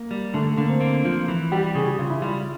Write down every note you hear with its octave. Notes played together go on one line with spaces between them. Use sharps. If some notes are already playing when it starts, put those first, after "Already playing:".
Already playing: A#3
G3
D3 A3
A3
D3 A#3
C4
A#3
F3 F4
E3
G3 G4
C#3 G#4
G4
C#3 F4
E4
G3 F4